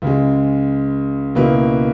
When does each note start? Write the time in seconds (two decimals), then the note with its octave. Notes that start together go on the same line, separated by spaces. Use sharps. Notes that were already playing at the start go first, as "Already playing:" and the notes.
0.02 C#2 C#3 G#3
1.35 C#2 B2 A#3 E4 B4